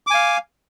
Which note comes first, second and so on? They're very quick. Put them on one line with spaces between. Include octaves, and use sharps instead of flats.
D6 G#5 F5